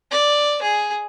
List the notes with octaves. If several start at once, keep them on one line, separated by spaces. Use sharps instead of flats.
D5
G#4